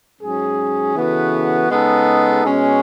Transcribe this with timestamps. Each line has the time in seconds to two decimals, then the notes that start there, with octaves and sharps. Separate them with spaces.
0.20 G#2 F#3 C#4 G#4
0.95 C#3 E3 B3 F#4 A4
1.70 C#3 G#3 B3 D#4 A4
2.45 B2 G#3 C#4